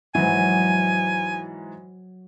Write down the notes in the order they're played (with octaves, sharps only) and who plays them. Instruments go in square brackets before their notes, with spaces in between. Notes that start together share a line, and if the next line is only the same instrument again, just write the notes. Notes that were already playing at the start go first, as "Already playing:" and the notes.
[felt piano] G#2 E3 [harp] F#3 [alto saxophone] G#5